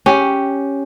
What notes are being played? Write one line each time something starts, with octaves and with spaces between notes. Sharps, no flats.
C#4 G4